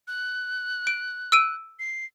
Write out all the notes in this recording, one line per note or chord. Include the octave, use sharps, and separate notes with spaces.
F#6
D7
E6 D7 D#7
C7